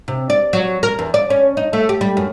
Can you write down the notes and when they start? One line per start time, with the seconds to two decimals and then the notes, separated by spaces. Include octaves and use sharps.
0.08 C3
0.30 D5
0.53 F#3
0.83 A#4
0.99 E2
1.14 D5
1.30 C#4
1.57 D#4
1.73 A3
1.89 G4
2.01 G3
2.17 F#2